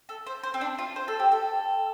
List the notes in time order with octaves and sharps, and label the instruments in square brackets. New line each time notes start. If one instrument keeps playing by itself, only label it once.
[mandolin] A4
C5
C5
C4
D4
F4
C5
A4
G4
A4